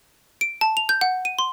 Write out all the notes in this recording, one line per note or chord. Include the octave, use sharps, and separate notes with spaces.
D7
A5
F7
G6
F#5
D#7
C6